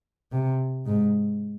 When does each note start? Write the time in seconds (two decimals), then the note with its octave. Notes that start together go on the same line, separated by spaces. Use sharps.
0.32 C3
0.86 G#2